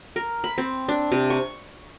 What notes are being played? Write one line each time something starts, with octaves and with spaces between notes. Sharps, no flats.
A#4
B5
C4
D4
C3
C#6